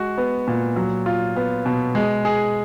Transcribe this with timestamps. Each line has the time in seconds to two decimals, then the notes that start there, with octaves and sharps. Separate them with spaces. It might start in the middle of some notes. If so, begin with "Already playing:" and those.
Already playing: G#3 F#4
0.18 B3
0.48 A#2
0.76 F#3
1.06 F4
1.36 B3
1.66 B2
1.95 G#3
2.25 G#4